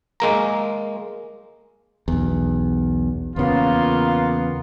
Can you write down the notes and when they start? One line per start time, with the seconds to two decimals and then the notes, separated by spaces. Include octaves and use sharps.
0.20 G#3 A#3 A#5
2.08 B1 E2
3.36 E2 C#3 A#3 B3 F4